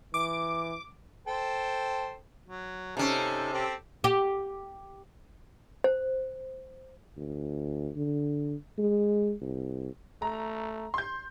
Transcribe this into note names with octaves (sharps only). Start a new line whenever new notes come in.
E3 D6
A4 C5 G5
F#3
C3 C#4 D#4 A4
C4 G4 A4
G4
C5
D2
D3
G#3
C2
A3 A#5
C6 G6